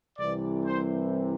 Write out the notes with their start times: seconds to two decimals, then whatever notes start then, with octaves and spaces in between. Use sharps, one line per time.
0.18 C2 C3 E3 D5
0.65 C5